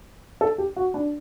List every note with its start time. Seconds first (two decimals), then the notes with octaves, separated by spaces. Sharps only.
0.41 A4
0.58 G4
0.76 F#4
0.94 D4